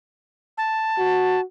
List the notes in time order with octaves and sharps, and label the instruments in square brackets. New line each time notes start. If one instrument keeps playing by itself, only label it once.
[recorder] A5
[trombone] F#4